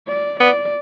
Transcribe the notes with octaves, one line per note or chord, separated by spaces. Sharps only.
D5
B3 D5